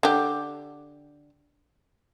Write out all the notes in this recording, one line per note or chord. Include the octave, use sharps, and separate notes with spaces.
D3 G4